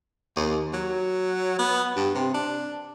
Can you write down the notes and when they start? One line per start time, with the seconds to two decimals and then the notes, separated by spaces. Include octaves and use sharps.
0.36 D#2
0.73 F#3
1.59 B3
1.96 G2
2.15 C3
2.34 D4